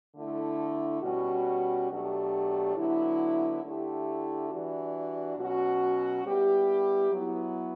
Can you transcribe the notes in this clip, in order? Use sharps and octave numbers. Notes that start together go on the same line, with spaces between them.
D3 A3 E4
B2 G3 C#4 F#4
B2 F#3 A3 D4 G4
D3 F#3 B3 E4
D3 A3 E4 G4
E3 G3 D4 F#4
B2 F#3 C#4 F#4
G3 B3 E4 G4
F#3 B3 E4